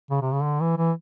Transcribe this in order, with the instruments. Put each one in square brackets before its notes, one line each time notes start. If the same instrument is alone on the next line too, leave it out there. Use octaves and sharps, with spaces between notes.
[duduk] C#3
C3
C#3
D3
E3
E3